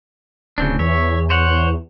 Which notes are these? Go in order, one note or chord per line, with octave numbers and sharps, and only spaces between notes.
D1 C#3 C4 D4
E2 C#5 E5
C5 C#5 F#5